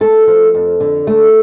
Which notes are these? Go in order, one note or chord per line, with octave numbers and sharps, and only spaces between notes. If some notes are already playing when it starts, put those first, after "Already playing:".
A3 A4
F3
F2
D3
A3